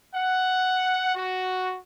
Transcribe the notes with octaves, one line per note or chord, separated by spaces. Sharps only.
F#5
F#4